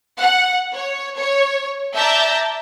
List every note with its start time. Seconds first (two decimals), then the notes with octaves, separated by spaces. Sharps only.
0.20 F#5
0.75 C#5
1.17 C#5
1.96 D5 E5 A5 A#5 G6